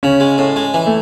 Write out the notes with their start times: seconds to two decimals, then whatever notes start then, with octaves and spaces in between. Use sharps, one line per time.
0.03 C#3 C#4
0.20 G#3
0.38 A2
0.56 G#3
0.74 E3
0.87 A3